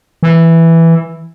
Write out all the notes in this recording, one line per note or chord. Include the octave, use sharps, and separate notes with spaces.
E3